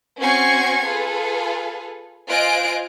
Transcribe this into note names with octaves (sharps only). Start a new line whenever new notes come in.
C4 C#4 F#4 C#6 G#6 C7
F4 G#4 A4 B4
F4 C5 D#5 G#5 F#6 D7